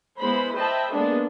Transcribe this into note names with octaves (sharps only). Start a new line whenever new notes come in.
G#3 B3 E4 C5 B5
C5 D#5 E5 G5 A5 B5
G#3 A#3 B3 D4 G#4 A4